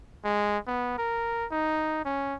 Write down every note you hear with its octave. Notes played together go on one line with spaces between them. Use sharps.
G#3
B3
A#4
D#4
C#4